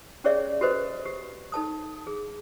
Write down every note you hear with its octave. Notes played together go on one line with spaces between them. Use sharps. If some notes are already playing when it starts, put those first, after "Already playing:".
C#4 G4 G#4 C#5 D5 E5
F#4 G4 A4 B4 C5 D#5
G4
D#4 A4 A5 D#6
G#4